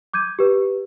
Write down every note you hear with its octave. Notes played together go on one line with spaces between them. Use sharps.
D6 G6 G#6 D#7
G4 B4